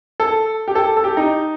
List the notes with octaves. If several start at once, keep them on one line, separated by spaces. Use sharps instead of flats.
A4
G4
A4
A4
G4
D#4